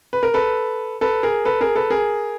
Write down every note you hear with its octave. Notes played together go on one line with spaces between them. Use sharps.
B4
A#4
A4 B4
A4 B4
G#4 A#4
A4 B4
G#4 A#4
A4 B4
G#4 A#4